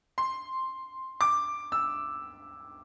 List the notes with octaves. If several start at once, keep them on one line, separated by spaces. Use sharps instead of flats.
C6
D6
E6